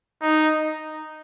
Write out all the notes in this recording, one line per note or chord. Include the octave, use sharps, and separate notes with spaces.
D#4